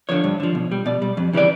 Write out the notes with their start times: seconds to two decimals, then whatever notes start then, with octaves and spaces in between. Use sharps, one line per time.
0.09 D3 F3 C#5
0.24 G2
0.40 D3 F3
0.55 B2
0.72 G3
0.86 B2 D5
1.02 G3
1.17 F2
1.33 C#3 E3 G3 D5